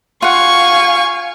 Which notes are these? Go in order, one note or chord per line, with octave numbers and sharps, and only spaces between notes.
F4 F5 F#5 G#5 C#6